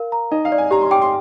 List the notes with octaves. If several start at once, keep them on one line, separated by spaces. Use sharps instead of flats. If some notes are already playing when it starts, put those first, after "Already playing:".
Already playing: A#4 F5
A#5
D#4 D#5
F5
D5
G#5
G4 A#5
C6
G5 D6
C6